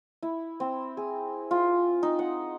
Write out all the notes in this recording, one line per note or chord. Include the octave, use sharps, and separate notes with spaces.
E4
C4
G#4
F4
D#4
F#5